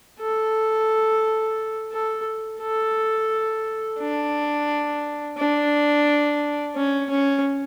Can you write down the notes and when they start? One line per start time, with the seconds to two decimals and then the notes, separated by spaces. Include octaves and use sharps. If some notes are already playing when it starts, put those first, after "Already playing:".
0.19 A4
1.92 A4
2.61 A4
3.99 D4
5.38 D4
6.76 C#4
7.10 C#4